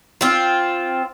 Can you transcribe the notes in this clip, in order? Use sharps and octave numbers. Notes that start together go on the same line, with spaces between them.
C4 F4